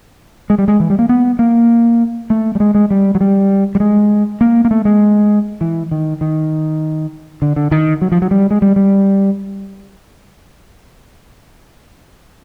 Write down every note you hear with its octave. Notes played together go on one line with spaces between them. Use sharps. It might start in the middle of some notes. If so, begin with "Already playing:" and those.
G#3
G3
G#3
E3
G3
A#3
B3
A#3
A3
G3
G#3
G#3
G3
F#3
G3
G3
G#3
A#3
A#3
A3
G#3
E3
D#3
D#3
D3
D3
D#3
F#3
F3
F#3
G3
G#3
G3
G3